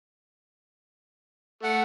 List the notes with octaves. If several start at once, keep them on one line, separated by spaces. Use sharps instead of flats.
A3 F#5